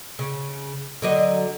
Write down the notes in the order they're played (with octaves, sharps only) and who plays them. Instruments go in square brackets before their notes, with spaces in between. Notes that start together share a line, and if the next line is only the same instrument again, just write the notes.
[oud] C#3
D3 F#3 D#5